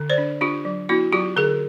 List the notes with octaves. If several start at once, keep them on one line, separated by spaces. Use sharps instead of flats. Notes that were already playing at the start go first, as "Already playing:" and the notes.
Already playing: D3
C5 D5
D4
D4 F4 G4
F#3
B3 E4 F#4
F#3 F4 G4
D3 G#4 A#4